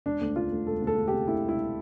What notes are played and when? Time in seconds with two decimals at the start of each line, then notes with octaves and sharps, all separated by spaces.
0.06 E1 D4
0.21 D2
0.36 D2 F4
0.52 D2
0.67 E1 A4
0.82 D2
0.87 A4
0.98 D2
1.08 G4
1.13 C3
1.28 D2 E4
1.44 E1 E4